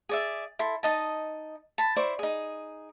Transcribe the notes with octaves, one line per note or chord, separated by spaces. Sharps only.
G#4 D5 E5
E4 A4 C6
D#4 D#5 A5
A5 B5
E4 C5 D5 C#6
D#4 G#4